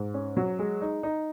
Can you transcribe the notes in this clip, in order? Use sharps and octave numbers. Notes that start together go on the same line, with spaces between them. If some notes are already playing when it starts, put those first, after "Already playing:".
Already playing: G#2
C#4
F#3
G#3
D#4
D#4